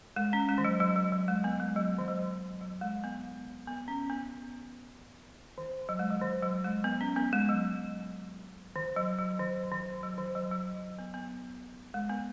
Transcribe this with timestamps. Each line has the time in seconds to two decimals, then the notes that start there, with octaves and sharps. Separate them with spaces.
0.16 G#3
0.33 C#4
0.49 G#3
0.58 D#3
0.65 F#3
0.80 F#3
0.96 F#3
1.12 F#3
1.28 G#3
1.44 B3
1.60 G#3
1.76 F#3
1.98 D#3
2.08 F#3
2.61 F#3
2.81 G#3
3.04 B3
3.67 B3
3.88 C#4
4.09 B3
5.58 D#3
5.89 F#3
5.99 G#3
6.10 F#3
6.21 D#3
6.43 F#3
6.64 G#3
6.84 B3
7.01 C#4
7.16 B3
7.33 G#3
7.49 F#3
8.76 D#3
8.96 F#3
9.19 F#3
9.39 D#3
9.71 D#3
10.03 F#3
10.18 D#3
10.35 F#3
10.51 F#3
10.99 B3
11.14 B3
11.94 G#3
12.09 B3